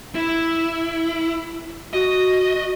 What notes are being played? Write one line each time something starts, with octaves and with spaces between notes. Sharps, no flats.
E4
F#4 D#5